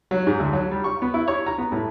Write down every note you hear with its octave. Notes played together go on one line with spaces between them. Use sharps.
F#3
G#2
D2
F#3
G3
C#6
B3
E4
C#5
A#5
B3
A2